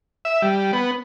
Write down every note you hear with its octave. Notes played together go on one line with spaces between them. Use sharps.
E5
G3
B3